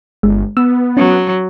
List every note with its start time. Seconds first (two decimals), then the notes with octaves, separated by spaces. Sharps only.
0.23 G1 G#3
0.57 B3 E6
0.97 F#3 C#4